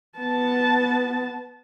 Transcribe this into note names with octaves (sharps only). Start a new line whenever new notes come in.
B3 A5